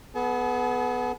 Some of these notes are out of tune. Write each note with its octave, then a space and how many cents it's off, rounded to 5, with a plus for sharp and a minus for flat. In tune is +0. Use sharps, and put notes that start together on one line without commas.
B3 +0 G#4 +45 A5 -45